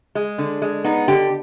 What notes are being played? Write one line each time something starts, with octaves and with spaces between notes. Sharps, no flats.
G#3
D3
G#3
B3 D#4
D3 G4